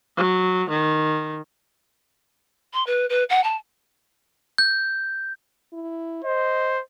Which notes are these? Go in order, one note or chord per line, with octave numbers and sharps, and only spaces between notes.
F#3
D#3
C6
B4
B4
F#5
A5
G6
E4
C5 D#5